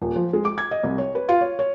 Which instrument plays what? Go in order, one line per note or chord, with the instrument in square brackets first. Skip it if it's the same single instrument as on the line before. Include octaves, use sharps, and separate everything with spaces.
[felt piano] D#1
F3
G#3
D6
G#6
D#5
C2
C#5
B4
F4
C#5
C#5